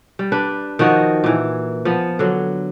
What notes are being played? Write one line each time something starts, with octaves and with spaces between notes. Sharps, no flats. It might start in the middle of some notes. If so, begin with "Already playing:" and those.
G3
D4 B4
D#3 F3 F#4 D#5
A#2 E3
F3 B3
D3 F#3